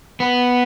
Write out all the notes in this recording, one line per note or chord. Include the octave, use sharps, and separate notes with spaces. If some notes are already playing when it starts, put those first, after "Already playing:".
B3